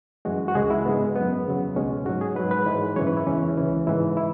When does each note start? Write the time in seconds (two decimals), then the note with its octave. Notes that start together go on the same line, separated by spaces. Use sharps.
0.25 F#2 E3 G#3 F#4
0.48 F#4
0.55 C#2 C#3 G#3 G#4
0.70 E4
0.85 G#2 G#3 B3
1.15 F#2 F#3 B3
1.46 E2 C#3 F#3
1.76 C#2 B2 G#3 C#4
2.06 G#2 F#3 F#4
2.21 G#4
2.36 G#2 F#3 B4
2.51 B4
2.67 G#2 E3 G#3
2.96 F#2 C#3 E3 C#5
3.07 B4
3.17 E4
3.27 E2 E3 G#3 C#4
3.57 C#2 C#3 E3
3.87 G#2 E3 G#3 E4
4.17 E4